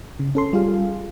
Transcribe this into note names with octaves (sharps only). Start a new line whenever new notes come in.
C#3
C#4 A4 C6
G3 F4 G#4 F5